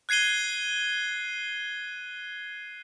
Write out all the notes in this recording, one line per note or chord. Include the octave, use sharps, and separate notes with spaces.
F#6 G#6 C7 D#7 G7